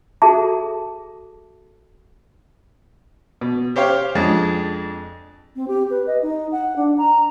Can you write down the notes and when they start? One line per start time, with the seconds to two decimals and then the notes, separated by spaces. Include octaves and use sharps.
0.22 F#4 G#4 A4 E5 A5 A#5
3.41 B2
3.76 G4 C5 C#5 F5 G5
4.15 F2 G#3 D4
5.56 C4
5.68 G4
5.91 B4
6.07 D#5
6.22 D#4
6.52 F#5
6.76 D4
6.98 A#5